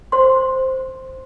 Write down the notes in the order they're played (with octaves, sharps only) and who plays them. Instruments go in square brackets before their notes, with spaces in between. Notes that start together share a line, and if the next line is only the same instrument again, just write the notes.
[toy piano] C5 C6